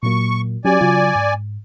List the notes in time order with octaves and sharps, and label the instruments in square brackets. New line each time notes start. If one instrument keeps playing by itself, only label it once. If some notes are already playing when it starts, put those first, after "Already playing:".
[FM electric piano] A#2 F#3 A#3 [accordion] C#6
[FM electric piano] F#3 C#4 G4 [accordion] D5 G#5
[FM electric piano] C#3 F#3 F4
G#2